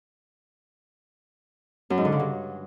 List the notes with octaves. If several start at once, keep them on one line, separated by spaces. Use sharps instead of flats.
F#2
G#2
D3
C#3
G2